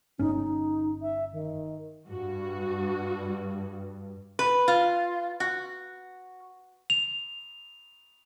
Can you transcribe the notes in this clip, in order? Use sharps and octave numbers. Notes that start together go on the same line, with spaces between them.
G1 C#4 D#4
D#4
E5
D#3
G2 F#4
B4
F4
F#4
F7